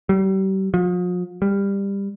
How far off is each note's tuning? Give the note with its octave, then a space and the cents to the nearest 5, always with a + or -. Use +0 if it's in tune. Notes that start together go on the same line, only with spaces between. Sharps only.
G3 -35
F3 +40
G3 +20